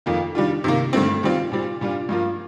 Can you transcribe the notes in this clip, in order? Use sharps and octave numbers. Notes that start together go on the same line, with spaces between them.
F2 D#3 A#3 F4
D#3 G3 D4 F4
C3 D#3 A#3
G2 D3 A3 C4
D#3 G3 C4 F4
A#2 G3 C4
A#2 G3 D4 F4
G2 F3 A#3 F4